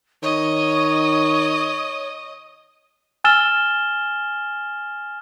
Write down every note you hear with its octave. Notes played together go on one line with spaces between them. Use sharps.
D#3 C#5 D#5
G#5 E6 F6 A6 E7 G7